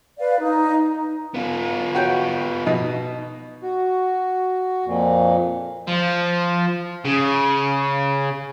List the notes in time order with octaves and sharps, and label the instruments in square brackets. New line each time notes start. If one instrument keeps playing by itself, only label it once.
[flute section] B4 D5 F5
D#4
[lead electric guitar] B3 F4
[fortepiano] F#4 C#5 G5
B2 D#4
[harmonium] F#4
F2 A#2
[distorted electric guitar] F3
C#3